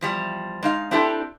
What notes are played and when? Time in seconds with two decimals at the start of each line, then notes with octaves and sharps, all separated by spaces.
0.01 E2 F3 G3
0.63 G#3 D#4 F5
0.91 C4 D4 E4 G4 A4